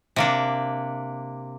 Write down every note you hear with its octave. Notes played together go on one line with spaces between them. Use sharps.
C3 A#3 D4